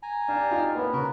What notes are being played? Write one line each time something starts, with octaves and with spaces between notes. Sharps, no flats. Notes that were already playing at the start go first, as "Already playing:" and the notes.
G#5 A#5
D4 G4 F5 A5
D#4 F4
A#3 B3 B4 C#5
C#3 F#4 A#4 B4